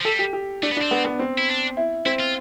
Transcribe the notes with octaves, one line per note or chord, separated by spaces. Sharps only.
F3
G3 A4
G4
G4
A3 D4
B3
D4
C4
B3
B3
C4
E4
D4
E4
C4 E4
F4